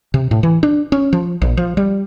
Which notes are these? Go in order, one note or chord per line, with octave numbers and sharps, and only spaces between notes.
C3
A2
E3
D4
C#4
F3
A#1
F3
G3